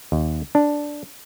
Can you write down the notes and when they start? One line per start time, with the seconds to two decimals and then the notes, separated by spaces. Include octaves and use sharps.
0.12 D#2
0.55 D4